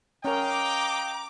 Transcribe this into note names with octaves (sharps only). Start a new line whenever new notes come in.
C#4 A#4 D#5 F5 G5 A#5 D6